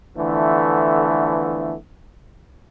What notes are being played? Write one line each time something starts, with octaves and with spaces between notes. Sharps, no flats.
D3 E3 F3 A3 B3